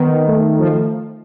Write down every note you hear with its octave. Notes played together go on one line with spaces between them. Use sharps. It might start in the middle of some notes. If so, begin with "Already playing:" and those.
Already playing: D#3 B3
A3
F3